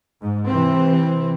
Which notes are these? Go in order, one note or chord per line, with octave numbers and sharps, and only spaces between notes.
G#2
C3 E3 C4